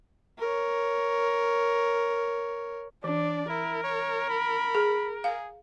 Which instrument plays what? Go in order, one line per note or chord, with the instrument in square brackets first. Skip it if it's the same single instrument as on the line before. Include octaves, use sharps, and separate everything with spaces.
[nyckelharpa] A#4 C#5
[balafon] E3 [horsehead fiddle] D4 [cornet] D5
[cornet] E4 [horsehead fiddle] A#4
[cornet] C#5
B5
[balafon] G#4
[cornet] G#4 [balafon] F5